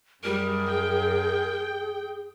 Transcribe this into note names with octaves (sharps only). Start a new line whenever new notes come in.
F#2 G3 G#4 A#4
G5